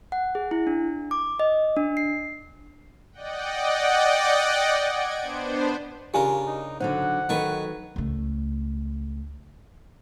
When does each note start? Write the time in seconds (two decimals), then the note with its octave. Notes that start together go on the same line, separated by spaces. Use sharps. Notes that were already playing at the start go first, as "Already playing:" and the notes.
0.12 F#5
0.35 G#4
0.51 E4
0.67 D4
1.11 D6
1.40 D#5
1.77 D4
1.97 C7
3.12 D5 D#5 F#5 G5
4.81 G#6 D7
5.22 B3 D4 C5
6.14 C#3 D4 F4 G4 A#4 G#5
6.47 D#4
6.80 D3 F#3 D#4 C5 F#5
7.29 D#3 F#3 A4 B4 C#6
7.96 C#2 A3